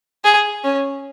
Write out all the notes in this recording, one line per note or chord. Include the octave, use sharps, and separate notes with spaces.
G#4
C#4